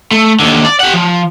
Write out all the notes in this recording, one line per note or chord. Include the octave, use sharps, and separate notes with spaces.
A3
D#2 D3
D5
G4 F#5
F3